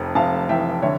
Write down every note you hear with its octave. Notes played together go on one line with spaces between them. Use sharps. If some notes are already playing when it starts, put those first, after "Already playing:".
Already playing: F1 F2 A5
F1 F5 A5
E3 E5 G5
D3 C#5 E5